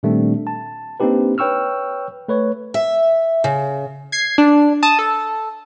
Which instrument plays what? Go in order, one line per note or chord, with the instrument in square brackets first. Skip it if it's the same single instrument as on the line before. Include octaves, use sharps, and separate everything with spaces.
[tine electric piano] A#2 D#3 G3 A3 C4 D4
A5
A#3 C4 D4 D#4 G4 B4
B4 C#5 G5 C#6 E6 F6
A3 B4 C#5
[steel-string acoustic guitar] E5
C#3
[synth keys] G#6 C7
D4
A5 D#6
A4